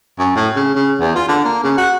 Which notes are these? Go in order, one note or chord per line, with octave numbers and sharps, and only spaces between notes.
F#2
A2
C#3
C#3
E2
F4
D3
A#3
C#3
F#4